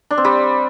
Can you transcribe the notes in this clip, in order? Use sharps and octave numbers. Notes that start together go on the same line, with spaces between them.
D4
C4
G3